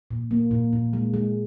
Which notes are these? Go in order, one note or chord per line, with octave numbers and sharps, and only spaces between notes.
A#2
A#3
A#2
A#2
G#3
G#3